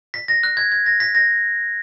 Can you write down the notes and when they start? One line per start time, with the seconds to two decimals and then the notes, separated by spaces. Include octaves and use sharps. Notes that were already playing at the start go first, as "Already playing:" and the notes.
0.14 B6
0.28 A#6
0.43 F#6
0.57 G#6
0.72 G#6
0.86 A#6
1.00 B6
1.15 A#6